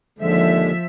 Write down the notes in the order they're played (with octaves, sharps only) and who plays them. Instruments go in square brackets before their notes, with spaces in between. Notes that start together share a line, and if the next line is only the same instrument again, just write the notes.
[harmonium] D#2 D3 G#3 [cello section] F3 E5